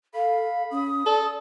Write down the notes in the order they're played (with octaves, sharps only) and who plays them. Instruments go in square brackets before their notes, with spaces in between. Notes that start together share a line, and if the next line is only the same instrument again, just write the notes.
[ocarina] A4 [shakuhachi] F5 [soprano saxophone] B5
[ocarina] C#4 [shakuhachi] D#6
[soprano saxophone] A4 [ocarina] D5